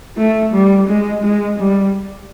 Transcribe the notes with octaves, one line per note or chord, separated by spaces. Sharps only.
A3
G3
G#3
G#3
G3